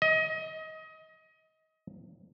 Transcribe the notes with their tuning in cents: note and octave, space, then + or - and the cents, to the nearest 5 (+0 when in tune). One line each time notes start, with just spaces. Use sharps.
D#5 +25